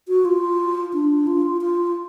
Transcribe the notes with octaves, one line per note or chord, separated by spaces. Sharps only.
F#4
F4
D4
F4
F4